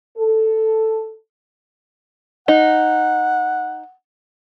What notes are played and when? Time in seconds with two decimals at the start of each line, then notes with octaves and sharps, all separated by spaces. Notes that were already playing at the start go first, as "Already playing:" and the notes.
0.18 A4
2.48 D#4 F#5